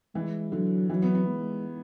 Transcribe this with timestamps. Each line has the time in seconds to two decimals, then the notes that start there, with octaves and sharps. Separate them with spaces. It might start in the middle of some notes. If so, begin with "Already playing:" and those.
0.15 E3 G#3
0.52 D3 F#3
0.90 E3 F#3
1.02 B3
1.15 B3
1.28 G#3